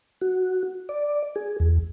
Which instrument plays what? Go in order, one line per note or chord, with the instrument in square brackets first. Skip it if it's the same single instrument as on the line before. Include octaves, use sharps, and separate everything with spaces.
[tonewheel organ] F#4
D5
G#4
E2